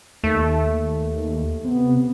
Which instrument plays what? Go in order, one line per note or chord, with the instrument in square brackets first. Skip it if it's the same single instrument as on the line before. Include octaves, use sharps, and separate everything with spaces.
[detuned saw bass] D#2 [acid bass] A3
[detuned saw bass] C3 [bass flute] B3